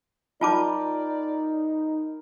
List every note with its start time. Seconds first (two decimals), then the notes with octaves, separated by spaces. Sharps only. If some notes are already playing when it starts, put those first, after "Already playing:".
0.41 D#4 F4 A#4 D5 G5 A5 B5 D6